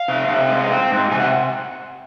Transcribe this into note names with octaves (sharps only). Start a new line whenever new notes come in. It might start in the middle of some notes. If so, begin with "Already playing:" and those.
Already playing: F5
C3
C3
G#3
C4
G#2
C3 G#5
F#5